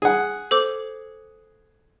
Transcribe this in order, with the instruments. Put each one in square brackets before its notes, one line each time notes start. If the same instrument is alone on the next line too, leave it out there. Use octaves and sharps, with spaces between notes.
[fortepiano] G#4 F#5
[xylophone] A4 C5 D6